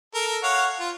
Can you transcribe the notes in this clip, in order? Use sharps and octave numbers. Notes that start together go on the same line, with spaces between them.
A4 A#4
C#5 F5 F#5
F4